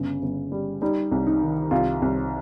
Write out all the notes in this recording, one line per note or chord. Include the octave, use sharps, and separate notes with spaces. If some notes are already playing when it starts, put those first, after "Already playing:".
Already playing: G1 C#3
G1
G3
G3 D#4
C2
D#4
D#3
C2 F4
C2